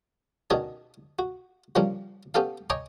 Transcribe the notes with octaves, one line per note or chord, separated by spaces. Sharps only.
B2 D#3 C#4 D4 G#4 A5
F#4
C#3 F3 G3 A#3 C#4 D4
B3 C#4 G4 A4 F5
C#5 D#5 G5 G#5 A#5 D6